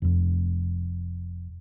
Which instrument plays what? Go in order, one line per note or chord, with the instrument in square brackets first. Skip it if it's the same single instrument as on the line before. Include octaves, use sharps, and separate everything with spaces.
[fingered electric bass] F1 F2